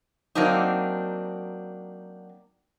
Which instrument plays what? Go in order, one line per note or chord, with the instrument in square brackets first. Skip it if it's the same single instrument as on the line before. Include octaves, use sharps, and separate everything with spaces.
[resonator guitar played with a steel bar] F#3 A#3 C4 D4 D#4